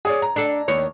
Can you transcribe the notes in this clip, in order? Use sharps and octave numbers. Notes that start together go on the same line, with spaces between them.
G#4 C#5 D5
A#5
D4 A4
D#2 C#5